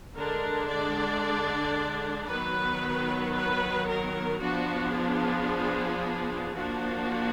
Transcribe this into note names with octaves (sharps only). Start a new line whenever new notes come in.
D3 G#3 D4 A#4
D5
D#3 F#3 B3 B4
B4
A#4
F3 B3 D4 F#4
G#4
F3 A#3 D4 F#4